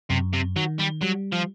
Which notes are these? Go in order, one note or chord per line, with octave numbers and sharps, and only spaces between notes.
F#2 C3
C3
D#3 F#3
G3
F#3 G3
F3